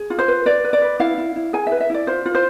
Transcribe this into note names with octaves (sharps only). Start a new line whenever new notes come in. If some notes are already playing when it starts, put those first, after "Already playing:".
Already playing: G#4
F4
C5
B4
B4 D5
B4
D5
B4
E4 F5
E4
E4
G#4 G#5
E5
B4
E5
E4 D5
F4 C5
F4
C5